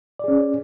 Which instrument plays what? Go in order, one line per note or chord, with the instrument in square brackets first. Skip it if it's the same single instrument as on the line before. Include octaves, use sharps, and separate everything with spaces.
[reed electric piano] D5
G#4
C#4